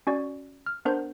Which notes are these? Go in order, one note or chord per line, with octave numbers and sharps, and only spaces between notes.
C#4 F#4 D5
F6
B3 D4 A#4 C5 G6